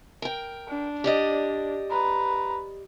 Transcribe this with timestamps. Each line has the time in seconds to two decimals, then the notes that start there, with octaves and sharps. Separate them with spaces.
0.22 A#4 G5
0.68 D4
1.04 G4 D5 D#5
1.90 B4 A#5